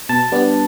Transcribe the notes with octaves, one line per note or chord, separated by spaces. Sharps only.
B2 A5
G3 B3 D4